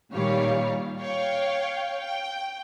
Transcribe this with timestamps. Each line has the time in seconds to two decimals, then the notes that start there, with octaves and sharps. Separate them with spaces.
0.13 A#2 D#3 G3 C#5 F5
1.01 C#5 F5 G5
2.00 G5